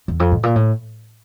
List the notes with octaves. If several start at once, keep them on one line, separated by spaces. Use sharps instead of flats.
E2
F2
A2
A#2
A2